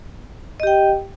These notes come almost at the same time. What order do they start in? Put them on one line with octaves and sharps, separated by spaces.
D#5 G4 G5